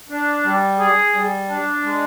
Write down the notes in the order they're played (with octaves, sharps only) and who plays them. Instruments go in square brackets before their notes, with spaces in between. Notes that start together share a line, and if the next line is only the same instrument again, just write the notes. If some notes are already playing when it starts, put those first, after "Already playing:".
[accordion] D4
G3
G#4
G3
D4
G#3